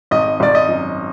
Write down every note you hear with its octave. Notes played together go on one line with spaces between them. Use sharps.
G#1 D#5
G#1 D5
D#5
F#2